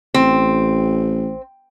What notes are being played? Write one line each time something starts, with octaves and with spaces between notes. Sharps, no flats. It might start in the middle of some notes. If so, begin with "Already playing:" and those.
A1 C4